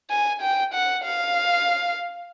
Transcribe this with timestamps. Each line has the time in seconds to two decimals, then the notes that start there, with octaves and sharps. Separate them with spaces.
0.10 G#5
0.41 G5
0.74 F#5
1.04 F5